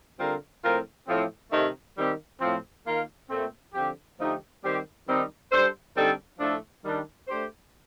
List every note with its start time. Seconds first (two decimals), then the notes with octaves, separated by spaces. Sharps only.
0.18 D3 G3 C4 F4 A#4
0.62 A2 F3 C4 F4 A#4
1.07 A2 F3 C4
1.51 C3 D#3 A3
1.96 D#3 G3 C4 G4
2.40 A2 F3 C4
2.84 D#3 A#3 F4 A#4
3.29 A#2 A3 C4
3.73 D3 F3 C4 G4
4.18 D3 F3 A3 D#4 G4
4.62 D#3 G3 C4 G4 C5
5.06 D#3 G3 C4 D#4
5.50 G3 D4 A4 C5
5.95 D3 G3 C4 D#4 A4
6.39 A2 F3 A3 D4 A4
6.83 D#3 G3 D4
7.28 A3 D4 G4 C5